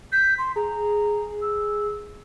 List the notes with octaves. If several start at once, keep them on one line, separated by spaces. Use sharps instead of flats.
G6 B6
C6
G#4 A#5
E6